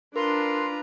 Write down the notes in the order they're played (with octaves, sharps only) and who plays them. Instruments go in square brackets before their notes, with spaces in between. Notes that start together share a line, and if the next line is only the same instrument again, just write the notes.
[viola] D4 [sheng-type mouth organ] F4 B4 A#5 [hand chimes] A#4 [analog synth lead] C6